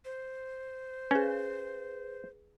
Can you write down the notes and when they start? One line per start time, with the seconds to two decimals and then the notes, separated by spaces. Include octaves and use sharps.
0.05 C5
1.11 C#4 G#4 B4